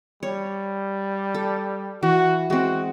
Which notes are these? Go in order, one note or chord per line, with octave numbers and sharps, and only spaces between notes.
G3 C#5
A4
E3 F#4
G#3 C4 F#4